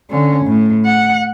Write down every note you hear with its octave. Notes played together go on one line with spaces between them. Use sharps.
D3 C#4
A2
F#5